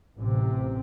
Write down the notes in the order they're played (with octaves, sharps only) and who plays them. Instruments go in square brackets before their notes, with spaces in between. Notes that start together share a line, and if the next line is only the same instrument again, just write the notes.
[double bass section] A1 C3